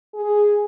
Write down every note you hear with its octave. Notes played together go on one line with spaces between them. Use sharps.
G#4